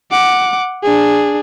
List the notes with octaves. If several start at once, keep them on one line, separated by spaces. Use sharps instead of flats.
F#5 D6
D4 G#4